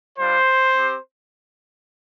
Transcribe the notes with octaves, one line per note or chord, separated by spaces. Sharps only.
G3 D4 F4 C5
C4 G4